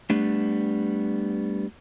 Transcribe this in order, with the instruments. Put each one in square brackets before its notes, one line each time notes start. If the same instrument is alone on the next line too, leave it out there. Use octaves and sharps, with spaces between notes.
[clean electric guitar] G3 A3 B3 D4